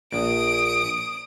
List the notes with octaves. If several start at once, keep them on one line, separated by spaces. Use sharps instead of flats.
A#1 D#6 D7